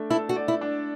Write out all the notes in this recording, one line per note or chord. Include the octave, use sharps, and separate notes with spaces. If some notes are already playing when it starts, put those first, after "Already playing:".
Already playing: A3 D4 D5
E4 A4
F#4
D5
E4
D4